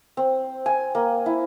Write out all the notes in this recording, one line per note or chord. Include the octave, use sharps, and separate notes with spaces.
C4
G#5
A#3
E4